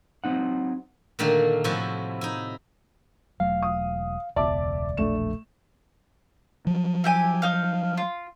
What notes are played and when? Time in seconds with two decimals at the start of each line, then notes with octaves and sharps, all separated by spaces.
0.24 F#3 C4 D#4 F#5
1.19 A#2 D3 D#3 A3 A#3
1.64 A2 C3 F3 E4 F#4
2.21 D#4 E4
3.40 E1 F#3 A3 F5
3.62 D#6
4.36 E1 C#2 B3 D5 E5 A5 D6
4.97 E1 A#1 A3 D4 E7
6.67 F3 F#3
7.04 E4 G4 G#5
7.42 D#4 F5
7.97 F4